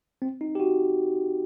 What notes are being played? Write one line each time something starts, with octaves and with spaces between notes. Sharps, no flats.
C4
D#4
G4
F#4